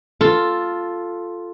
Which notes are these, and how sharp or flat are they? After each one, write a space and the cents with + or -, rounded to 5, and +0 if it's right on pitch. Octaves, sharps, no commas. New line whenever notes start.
F4 +0 A4 +0